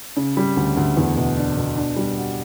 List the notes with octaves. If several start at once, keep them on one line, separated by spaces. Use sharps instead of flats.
C#3
G3
D2
D2
E2
B2
D4
B2
D4
G3
F#4